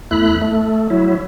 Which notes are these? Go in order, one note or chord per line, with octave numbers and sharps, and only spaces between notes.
E2 A3 E4 B5 F#6
A3
F#3 E4